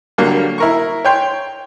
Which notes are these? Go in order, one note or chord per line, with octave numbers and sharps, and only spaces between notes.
D3 F#3 G3 A#3
E4 A#4 C#6
C#5 G5 C6